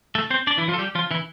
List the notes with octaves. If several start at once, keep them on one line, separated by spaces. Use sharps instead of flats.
A3 A4
C4 C5
D4 D5
E3 E4
F3 F4
A4
G3 G4
F3 F4
E3 E4